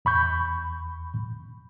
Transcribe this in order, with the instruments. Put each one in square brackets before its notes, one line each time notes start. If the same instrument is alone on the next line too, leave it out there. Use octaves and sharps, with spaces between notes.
[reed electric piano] E2 B5 C#6 G6